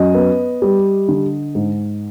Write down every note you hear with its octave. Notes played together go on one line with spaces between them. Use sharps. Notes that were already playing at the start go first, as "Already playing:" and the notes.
Already playing: F#2 D#5
B3
G3
D3
G#2